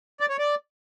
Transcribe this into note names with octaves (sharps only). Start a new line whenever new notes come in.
D5
C#5
D5